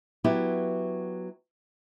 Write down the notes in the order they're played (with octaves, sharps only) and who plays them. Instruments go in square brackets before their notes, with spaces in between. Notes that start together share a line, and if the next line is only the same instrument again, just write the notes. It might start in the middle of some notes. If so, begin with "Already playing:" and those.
[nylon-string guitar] F#3 B3 E4 G4